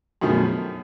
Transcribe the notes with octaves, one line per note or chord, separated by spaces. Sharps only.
F#2 B2 D#3 F3 A3 G#4